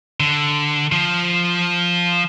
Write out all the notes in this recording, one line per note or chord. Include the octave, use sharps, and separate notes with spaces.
D3
F3